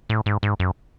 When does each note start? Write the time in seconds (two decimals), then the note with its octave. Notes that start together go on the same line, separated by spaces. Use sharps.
0.09 A2
0.26 G#2
0.43 G#2
0.60 F#2